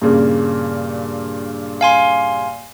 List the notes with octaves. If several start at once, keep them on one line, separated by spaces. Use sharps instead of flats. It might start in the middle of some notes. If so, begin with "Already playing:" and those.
G2 A#2 C#3
F5 G#5 C6